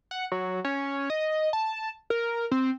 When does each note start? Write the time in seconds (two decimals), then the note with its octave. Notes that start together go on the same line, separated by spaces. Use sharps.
0.11 F#5
0.32 F#3
0.65 C#4
1.10 D#5
1.53 A5
2.10 A#4
2.51 C4